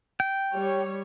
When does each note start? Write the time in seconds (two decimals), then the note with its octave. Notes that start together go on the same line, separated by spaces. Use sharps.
0.20 G5
0.52 G3 C#5